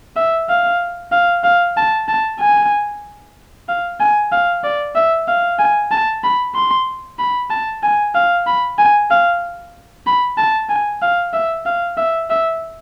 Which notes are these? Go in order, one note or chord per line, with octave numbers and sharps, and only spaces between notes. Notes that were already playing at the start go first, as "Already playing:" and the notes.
E5
F5
F5
F5
A5
A5
G#5
F5
G#5
F5
D5
E5
F5
G#5
A5
B5
C6
B5
A5
G#5
F5
B5
G#5
F5
B5
A5
G#5
F5
E5
F5
E5
E5